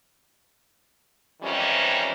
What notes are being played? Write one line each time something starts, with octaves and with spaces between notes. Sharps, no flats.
F2 G#2 D#3 E3 G3 C#4